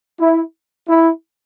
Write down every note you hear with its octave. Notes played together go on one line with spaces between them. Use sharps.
E4
E4